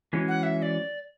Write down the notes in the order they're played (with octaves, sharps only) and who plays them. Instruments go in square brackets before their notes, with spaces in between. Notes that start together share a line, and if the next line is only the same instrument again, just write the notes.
[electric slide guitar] E3 G#3 C#4 F#4
[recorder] F#5
E5
E5
D5